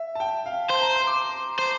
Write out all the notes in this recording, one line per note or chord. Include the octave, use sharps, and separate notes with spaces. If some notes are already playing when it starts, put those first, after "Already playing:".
Already playing: E5
A5
G5
F5
C5 A5
A#5
C6
D6
C5